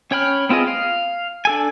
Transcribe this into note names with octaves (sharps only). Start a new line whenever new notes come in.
C#4 C#5 G5 B5 F6
B3 C4 F4 G#4 D#5
F5
D4 A4 G#5